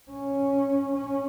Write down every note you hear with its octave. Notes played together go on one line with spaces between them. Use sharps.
C#4
C#4